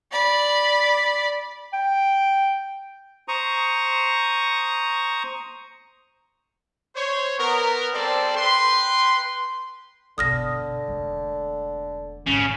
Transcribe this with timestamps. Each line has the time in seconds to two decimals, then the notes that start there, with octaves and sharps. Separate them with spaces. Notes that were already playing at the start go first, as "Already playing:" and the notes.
0.12 D5 B5
1.73 G5
3.28 C5 A#5 C#6 D#6
6.96 C5 C#5
7.39 B3 A#4
7.93 G3 C4 A4 C5 D5
8.36 B4 G5 C6
10.18 G1 B2 D3 D#6 F6 A#6
10.88 E1 A3
12.27 A1 G#2 C#3